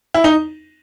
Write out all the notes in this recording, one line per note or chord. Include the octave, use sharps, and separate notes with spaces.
E4
D#4